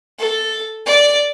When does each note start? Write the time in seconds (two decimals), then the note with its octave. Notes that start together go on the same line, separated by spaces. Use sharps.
0.20 A4
0.86 D5